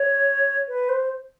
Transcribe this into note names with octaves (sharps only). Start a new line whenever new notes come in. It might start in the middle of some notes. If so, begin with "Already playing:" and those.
Already playing: C#5
B4
C5